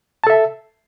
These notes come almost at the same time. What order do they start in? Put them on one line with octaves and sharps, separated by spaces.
A5 A4 E5